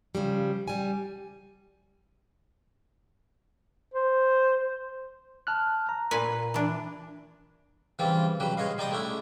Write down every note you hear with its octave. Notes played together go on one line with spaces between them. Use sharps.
C#3 F3 G3
G3 G#5
C5
A5 F6 F#6
A#5
A#2 B4 G#5
E3 D4
C#3 E3 G3 C4 F4
C#3 F#3 G3 B4
G#3 G#4 C#5 D#5 F5
G3 D#4 D5 G5 D#6
G#3 A3 C#4 D4 E4